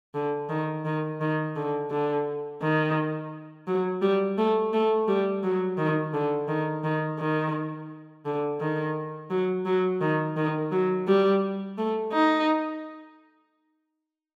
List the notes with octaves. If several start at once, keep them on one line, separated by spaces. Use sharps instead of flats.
D3
D#3
D#3
D#3
D3
D3
D#3
F#3
G3
A3
A3
G3
F#3
D#3
D3
D#3
D#3
D#3
D3
D#3
F#3
F#3
D#3
D#3
F#3
G3
A3
D#4